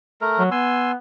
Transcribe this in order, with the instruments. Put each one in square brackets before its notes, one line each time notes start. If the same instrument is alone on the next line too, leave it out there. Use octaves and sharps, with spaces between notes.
[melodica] A3 A#4
[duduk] F#3
[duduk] B3 [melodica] G#5 C6 E6